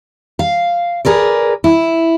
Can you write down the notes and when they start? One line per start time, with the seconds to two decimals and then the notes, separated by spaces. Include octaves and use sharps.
0.39 F5
1.05 G#4 A#4 B4 D5
1.64 E4